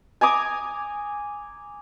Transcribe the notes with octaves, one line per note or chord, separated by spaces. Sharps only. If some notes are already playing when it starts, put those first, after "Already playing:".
G#5 A#5 D6 D#6